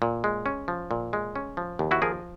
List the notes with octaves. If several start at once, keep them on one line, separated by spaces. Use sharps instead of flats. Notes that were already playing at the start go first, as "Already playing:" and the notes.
A#2
G#3
C#4
F3
A#2
G#3
C#4
F3
D#2
E4 F#4
F3 G#4 A#4